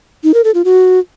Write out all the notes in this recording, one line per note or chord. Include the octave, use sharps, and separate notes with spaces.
D#4
A#4
A4
F4
F#4